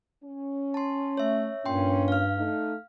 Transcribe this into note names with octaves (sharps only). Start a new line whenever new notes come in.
C#4
A5 C6
A3 C#5 E5
G2 A#2 C#4 G5 C6
F5 F6
A3 D#4